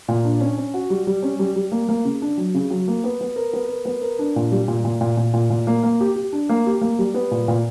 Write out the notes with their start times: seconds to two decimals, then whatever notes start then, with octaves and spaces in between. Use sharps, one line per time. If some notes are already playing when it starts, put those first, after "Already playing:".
0.08 A#2
0.24 D4
0.41 C#4
0.58 C#4
0.74 F#4
0.90 G3
1.07 G3
1.23 C#4
1.39 G3
1.56 G3
1.72 A#3
1.89 A#3
2.05 C#3
2.22 D4
2.37 F#3
2.54 C#3
2.70 F#3
2.88 A#3
3.04 B3
3.21 B3
3.36 A#4
3.53 B3
3.69 A#4
3.85 B3
4.02 A#4
4.19 D4
4.36 A#2
4.52 G3
4.68 A#2
4.84 A#2
5.01 A#2
5.17 A#2
5.33 A#2
5.50 A#2
5.67 A#3
5.83 A#3
6.00 G4
6.16 G4
6.33 D4
6.49 A#3
6.66 G4
6.81 A#3
6.99 G3
7.14 B3
7.31 A#2
7.48 A#2